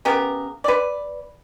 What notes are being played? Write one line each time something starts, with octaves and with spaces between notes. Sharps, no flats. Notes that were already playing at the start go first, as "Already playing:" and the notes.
C#3 B3 G4 A#4
B4 D5